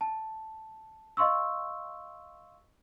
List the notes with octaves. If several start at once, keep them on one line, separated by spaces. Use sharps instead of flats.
A5
D#5 F5 C6 C#6 E6